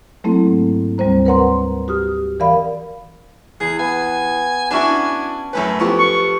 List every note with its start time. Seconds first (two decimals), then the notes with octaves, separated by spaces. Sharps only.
0.24 F#3 A3 A#3 C4 E4 A4
0.47 G#2
0.98 D2 G3 C4 C5 A#5
1.25 A#4 B4 C#5 F#5 A#5 C6
1.88 F#4 G4 D#6 F6
2.40 E3 A#4 D5 F5 B5
3.60 E2 G#4
3.79 B3 G#5
4.71 C#4 D4 E4 F#4 G#5 A5
5.53 F#2 A3 C#4 B4
5.80 F3 B3 G4 A4 C#5
5.99 C#6